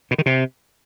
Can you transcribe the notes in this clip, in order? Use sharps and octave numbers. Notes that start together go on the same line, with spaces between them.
B2
D#3
C3